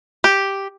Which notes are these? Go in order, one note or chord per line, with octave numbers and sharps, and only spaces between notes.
G4